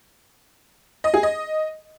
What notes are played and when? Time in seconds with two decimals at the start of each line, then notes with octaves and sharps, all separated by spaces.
1.04 D#5
1.14 G#4
1.23 D#5